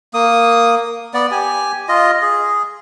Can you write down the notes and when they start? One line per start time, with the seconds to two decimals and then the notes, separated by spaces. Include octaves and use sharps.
0.14 A#3 D#6
1.14 B3 D5
1.31 G4 G#5
1.89 F4 D#5
2.22 G#4